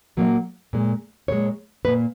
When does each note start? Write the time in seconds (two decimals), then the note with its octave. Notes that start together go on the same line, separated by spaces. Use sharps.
0.17 A#2 F#3 A#3
0.73 A#2 G#3
1.28 A#2 G#3 C#5
1.85 A#2 A#3 B4